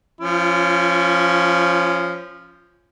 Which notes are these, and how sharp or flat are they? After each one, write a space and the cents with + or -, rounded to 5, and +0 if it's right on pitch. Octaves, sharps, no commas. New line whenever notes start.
F3 +0 C#4 +0 F4 -40